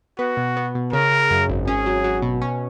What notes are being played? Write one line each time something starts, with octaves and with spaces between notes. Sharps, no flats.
B3 F#4
B2
B3
B2
C#3 A#4
C#3
F#2
G#1
C#4 G#4
F#3
F#3
B2
C#4